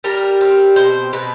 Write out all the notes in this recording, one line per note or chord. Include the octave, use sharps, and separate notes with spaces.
G3 A#4
C4
B2 C5
B2 B4